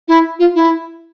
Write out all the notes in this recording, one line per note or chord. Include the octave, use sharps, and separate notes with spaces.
E4
F4
E4